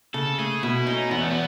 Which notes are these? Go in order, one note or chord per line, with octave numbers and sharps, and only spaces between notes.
C#3 A4
A3 G#4
B2 E4
C#4 D#4
E2 B3
A3
B3